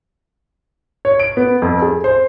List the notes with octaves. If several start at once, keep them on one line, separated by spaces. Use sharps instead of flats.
C#5
D7
B3
F2
G#4
C5